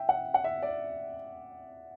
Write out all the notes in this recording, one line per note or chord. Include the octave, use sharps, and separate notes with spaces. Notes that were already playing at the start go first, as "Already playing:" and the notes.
Already playing: E5 G5
F#5
F#5
E5
D5